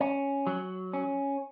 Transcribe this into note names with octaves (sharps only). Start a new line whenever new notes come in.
C#4
F#3
C#4